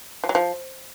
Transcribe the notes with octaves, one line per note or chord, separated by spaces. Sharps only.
F3
F#3
F3